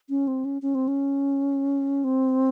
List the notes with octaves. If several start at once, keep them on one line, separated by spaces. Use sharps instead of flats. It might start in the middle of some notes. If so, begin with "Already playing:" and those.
C#4
C4
C#4
C#4
C4
C#4
C4